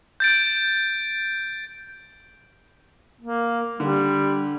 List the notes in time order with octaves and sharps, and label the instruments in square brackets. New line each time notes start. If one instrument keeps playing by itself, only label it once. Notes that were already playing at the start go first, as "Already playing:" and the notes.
[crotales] G6 A6 D7
[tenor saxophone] A#3
[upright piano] D3 [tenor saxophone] G3